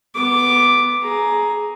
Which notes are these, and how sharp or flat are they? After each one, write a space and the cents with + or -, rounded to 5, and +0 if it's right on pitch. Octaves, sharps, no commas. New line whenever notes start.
B3 +0 D6 +0
G#4 +15 A#5 +5